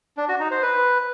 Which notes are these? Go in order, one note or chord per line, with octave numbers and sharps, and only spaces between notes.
D4
F#4
D#4
C5
B4